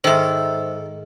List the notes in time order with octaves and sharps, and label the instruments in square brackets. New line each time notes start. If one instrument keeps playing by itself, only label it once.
[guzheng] G#2 D#3 [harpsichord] A4 [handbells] C5 E5